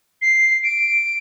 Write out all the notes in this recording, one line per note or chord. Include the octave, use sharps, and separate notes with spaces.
C7
D7